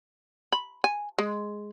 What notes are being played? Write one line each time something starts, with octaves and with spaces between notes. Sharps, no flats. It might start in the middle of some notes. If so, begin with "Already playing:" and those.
B5
G#5
G#3